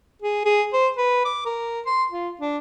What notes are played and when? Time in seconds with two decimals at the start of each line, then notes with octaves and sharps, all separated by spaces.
0.22 G#4
0.45 G#4
0.73 C5
0.97 B4
1.25 D6
1.46 A#4
1.86 C6
2.10 F4
2.41 D4